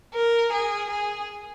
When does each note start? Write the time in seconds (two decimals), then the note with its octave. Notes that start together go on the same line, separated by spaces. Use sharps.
0.15 A#4
0.52 G#4
0.89 G#4